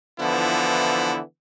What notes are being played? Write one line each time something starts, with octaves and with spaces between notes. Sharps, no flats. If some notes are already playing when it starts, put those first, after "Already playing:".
D3 E3 F3 B3 E4